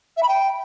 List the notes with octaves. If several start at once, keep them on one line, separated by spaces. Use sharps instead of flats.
E5
B5
G5